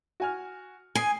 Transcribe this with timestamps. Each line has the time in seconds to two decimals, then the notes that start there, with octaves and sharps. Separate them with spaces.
0.20 F#4 G#5 F6
0.95 G#5 D#6 C7 D#7